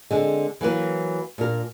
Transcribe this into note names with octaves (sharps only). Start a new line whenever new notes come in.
D3 G#3 C4
E3 F#3 A#3 B4
A#2 D4 A#4